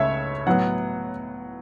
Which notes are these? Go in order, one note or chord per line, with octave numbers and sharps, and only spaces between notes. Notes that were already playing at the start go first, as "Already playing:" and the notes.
Already playing: C#2 C#3 A3 C#5 E5
A2 F#3 B3 F#5